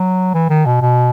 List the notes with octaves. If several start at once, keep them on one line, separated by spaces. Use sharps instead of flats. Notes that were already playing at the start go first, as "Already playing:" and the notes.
Already playing: F#3
E3
D#3
B2
B2